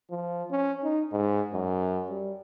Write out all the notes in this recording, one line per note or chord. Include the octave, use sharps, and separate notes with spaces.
F3
C#4
D#4
G#2
F#2
G3